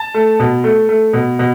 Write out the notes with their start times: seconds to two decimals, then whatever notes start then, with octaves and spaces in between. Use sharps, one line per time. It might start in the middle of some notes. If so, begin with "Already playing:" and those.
Already playing: A5
0.14 A3
0.40 B2
0.64 A3
0.89 A3
1.13 B2
1.39 B2